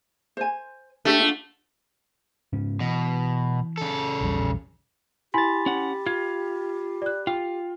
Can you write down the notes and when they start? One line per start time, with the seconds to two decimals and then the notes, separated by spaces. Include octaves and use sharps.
0.37 C5 G#5
1.05 A3 D4 G4
1.20 D4 F4 F#5
2.53 G#2 C#3 C#4
2.80 B2 E3
3.78 C#3 A4
4.21 A#1 E2 G3
5.34 E4 G4 G#5 B5 C6 A6
5.66 C#4 F#5
6.06 F4 G#6
7.02 D5 F#6
7.27 F4 G5